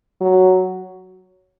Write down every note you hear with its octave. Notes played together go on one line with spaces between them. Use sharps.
F#3